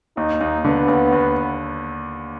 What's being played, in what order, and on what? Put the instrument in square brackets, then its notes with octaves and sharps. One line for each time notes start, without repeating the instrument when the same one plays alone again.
[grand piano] D#2 [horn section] D#4
[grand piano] D#2
[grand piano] D3 [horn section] B3
[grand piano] D#2
D#2